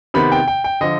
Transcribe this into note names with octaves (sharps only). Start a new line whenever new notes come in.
C3 D#3 B3 B5
G5
G5
G5
D3 F3 D#5